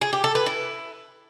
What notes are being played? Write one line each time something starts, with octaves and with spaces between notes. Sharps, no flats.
G#4
G4
A4
B4
E4